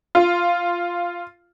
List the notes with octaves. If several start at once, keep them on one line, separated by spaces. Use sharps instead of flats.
F4